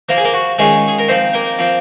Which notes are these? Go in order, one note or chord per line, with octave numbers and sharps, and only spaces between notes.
F3 A#3 F4 A#4
G#4
A#3 A#4
F#4
D#3 G#3 C#4 F4 G#4
G#4
A#4
F3 C4 D#4 C5
A#3 A#4
F3 C4 F4